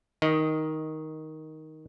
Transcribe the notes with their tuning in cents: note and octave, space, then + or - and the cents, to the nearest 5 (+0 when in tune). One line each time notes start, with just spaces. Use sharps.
D#3 +5 D#5 +0